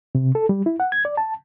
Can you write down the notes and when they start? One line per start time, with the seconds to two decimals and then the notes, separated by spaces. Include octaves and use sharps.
0.15 C3
0.35 A4
0.49 G3
0.66 E4
0.80 F#5
0.92 G#6
1.05 D5
1.17 A5